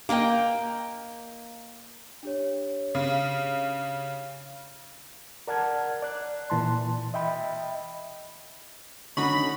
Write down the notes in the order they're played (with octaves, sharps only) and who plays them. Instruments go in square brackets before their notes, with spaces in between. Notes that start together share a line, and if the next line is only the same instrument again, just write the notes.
[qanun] A#3 A#4 D#5 G5
[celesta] D4 G4 C#5
[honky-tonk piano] C#3
[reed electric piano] A#4 D5 F#5 A5 F6 G#6
D5 F#6
A#2 E3 A5 C6
D#5 E5 G5 B5
[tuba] D3 [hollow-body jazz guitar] C#4 D#4 F#4 [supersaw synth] B5 [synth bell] C#6